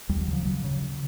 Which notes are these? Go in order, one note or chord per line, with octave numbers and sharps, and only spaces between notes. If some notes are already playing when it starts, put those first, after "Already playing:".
D#2 G3
F#3
C#3
F3
C#3 F#3
C#3
C#3